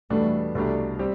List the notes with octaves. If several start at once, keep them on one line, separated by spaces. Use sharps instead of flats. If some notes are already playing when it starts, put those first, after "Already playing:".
E2 B2 G3 A3 D4
C2 B2 A3 B3 D4 G4
G3 C4 G4